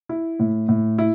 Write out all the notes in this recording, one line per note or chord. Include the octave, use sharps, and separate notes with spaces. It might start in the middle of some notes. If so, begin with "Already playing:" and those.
E4
A2
A2
E4